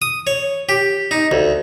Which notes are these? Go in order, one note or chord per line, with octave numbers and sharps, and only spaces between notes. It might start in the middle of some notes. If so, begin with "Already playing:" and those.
D#6
C#5
G4
D#4
D2